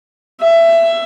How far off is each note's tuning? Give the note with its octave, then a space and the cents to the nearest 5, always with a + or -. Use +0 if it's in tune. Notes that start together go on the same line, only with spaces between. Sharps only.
E5 +15